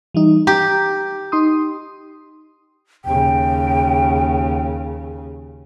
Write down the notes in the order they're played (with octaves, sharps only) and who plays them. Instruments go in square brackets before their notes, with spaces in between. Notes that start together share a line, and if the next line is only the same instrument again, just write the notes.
[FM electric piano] E3 G3 D#4
[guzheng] G4 [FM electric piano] A#5
[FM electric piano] D#4 C6 D#6
[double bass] D#2 C#3 [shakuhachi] G5